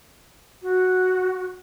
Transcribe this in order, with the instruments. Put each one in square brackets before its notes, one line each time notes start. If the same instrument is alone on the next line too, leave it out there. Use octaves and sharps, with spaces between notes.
[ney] F#4